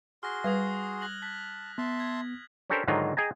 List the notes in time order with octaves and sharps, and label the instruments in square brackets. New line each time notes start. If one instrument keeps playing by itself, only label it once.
[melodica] F#4 G#4 C6 [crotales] F6 A#6
[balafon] G3 B4 [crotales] D#6 G#6 A#6
[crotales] F#6 A#6 F#7
[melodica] A5 [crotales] F#6 B6
[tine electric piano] B3 [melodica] E5 A5 C6
[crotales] G#6
[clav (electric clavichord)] C#4 D4 G4 A4 A#4 C5
G#2 D3 D#3 F#3 D#4 F4
G#4 D#5 G5 G#5 A#5